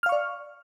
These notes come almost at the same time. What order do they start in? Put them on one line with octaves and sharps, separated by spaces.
F6 F5 C#6 D5